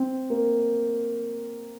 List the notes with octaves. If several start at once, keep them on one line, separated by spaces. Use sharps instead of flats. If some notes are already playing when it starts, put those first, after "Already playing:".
Already playing: C4
A#3